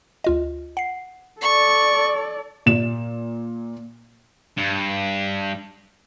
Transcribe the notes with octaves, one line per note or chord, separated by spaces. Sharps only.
D2 F4 D#5
F#5 C7
A4 D5 C#6
A#2 E7
G2